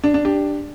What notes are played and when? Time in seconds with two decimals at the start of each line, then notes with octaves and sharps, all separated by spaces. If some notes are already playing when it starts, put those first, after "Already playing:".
0.04 D4
0.14 D4
0.25 D4 G4